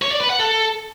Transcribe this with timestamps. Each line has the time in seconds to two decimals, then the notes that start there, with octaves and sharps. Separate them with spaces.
0.02 C#5
0.11 D5
0.21 B4
0.30 F#5
0.39 A4